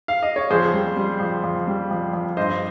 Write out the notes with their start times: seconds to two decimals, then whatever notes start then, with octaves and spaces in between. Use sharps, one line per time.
0.08 F5
0.23 D#5
0.36 C#5
0.50 F2 G#4 C5
0.74 G3
0.97 G3
1.20 F2
1.44 F2
1.67 G3
1.91 F2
2.13 F2
2.37 G2 C5 D#5